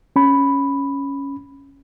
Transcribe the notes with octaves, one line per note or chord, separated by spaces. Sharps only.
C#4 B5